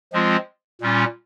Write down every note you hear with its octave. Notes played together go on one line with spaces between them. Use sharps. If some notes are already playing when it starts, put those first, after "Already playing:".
F3 G#3 C4 F4
A#2 G3 C#4 F4